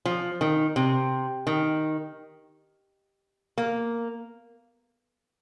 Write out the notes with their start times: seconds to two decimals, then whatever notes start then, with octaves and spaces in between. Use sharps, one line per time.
0.05 F3
0.41 D#3
0.76 C3
1.47 D#3
3.58 A#3